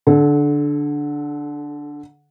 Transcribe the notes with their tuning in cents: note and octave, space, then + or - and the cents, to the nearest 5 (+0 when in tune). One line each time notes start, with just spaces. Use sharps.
D3 +0 A4 -30